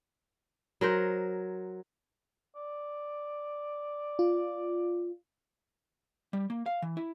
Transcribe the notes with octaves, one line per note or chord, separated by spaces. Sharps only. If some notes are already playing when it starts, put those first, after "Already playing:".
F#3 A#4 C5
D5
F4
G3
A#3
F5
E3
E4